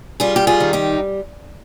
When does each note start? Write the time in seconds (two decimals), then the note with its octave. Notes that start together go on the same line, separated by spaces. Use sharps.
0.20 G3 F4 G#4
0.36 G4
0.47 F4 G#4
0.60 D#3
0.73 D#4 G4